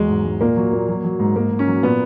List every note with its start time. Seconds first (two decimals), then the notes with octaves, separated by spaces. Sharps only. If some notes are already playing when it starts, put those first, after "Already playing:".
Already playing: E2 F#3 G#3
0.09 G#2
0.25 G#2
0.41 A#2 A#3
0.56 F#3
0.73 A#2
0.88 F#3
1.04 F#3
1.19 G#2
1.36 G#2 A#3
1.51 G#2
1.59 C#4
1.67 F#3
1.83 A#2 B3